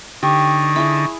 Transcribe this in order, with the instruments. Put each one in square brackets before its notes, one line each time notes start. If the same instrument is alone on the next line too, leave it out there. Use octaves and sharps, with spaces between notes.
[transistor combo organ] D3 D#4 [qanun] G4 [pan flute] C#6
[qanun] E4 G#4 E5